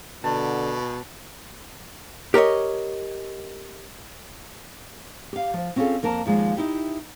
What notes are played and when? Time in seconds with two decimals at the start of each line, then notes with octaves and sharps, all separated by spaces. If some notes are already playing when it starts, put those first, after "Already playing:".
0.24 B2 D3 A5
2.34 G4 A#4 C#5 D#5
5.33 G4 F5
5.54 F3
5.76 C4 C#4 F4 F#4 G#4 A4
6.03 F2 A#3 A#4 A5
6.26 D#2 F3 G#3
6.57 D#4 E4 G4